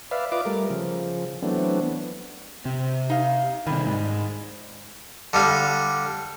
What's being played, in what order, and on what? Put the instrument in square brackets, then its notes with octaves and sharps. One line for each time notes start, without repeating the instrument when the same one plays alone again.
[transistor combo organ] B4 D5 E5 F5
F4 B4 D5 D#5 D6
G3 A3 A#4
C#3 F3
E3 F#3 A3 B3 C4 D4
[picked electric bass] C3
[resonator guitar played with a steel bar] D#4 F5
[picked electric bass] C3 D#3 [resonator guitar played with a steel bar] G3
[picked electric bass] G#2
[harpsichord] D3 G3 F5